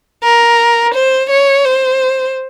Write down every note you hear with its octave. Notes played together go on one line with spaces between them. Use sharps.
A#4
C5
C#5
C5